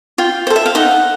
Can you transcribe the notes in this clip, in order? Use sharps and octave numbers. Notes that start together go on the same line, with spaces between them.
F4 G5
C5
A4
E5
F5
D#4 F#5